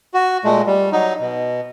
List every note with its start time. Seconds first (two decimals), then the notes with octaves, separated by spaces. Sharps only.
0.14 F#4
0.44 A#2 G#3 A3
0.67 G3
0.92 F#3 D#4
1.20 B2